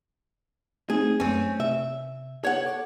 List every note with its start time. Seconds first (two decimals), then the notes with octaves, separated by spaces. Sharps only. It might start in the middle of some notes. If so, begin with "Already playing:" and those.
0.90 A3 C4 D#4 G#4
1.20 F#2 A3 C4 C#4
1.60 C3 E5
2.45 C#5 F#5
2.66 A4 C#6 D6